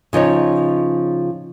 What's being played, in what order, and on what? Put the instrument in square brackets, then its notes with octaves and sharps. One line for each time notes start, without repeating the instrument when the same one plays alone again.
[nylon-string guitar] C#3 F3 D#4 C#5